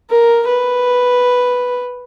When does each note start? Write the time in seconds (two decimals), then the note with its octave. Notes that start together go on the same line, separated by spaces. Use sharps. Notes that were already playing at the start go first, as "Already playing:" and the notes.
0.10 A#4
0.48 B4